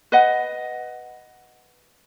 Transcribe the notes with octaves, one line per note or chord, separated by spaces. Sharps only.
B4 D#5 F#5